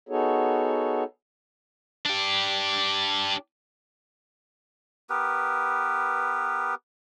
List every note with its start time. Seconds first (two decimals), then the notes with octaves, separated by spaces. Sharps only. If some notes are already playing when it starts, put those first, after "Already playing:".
0.09 B3 D#4 F#4 G#4 A4 C#5
2.05 D4 G4
5.10 B3 G4 A#4 B4